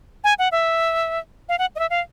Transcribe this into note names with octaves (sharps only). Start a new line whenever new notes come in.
G#5
F#5
E5
F5
F#5
D#5
E5
F5